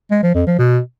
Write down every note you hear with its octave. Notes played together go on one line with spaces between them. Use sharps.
G#3
F3
F2
F3
B2